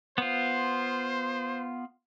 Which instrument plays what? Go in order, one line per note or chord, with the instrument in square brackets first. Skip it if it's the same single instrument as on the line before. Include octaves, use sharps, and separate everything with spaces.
[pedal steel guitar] B3 F4 [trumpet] C5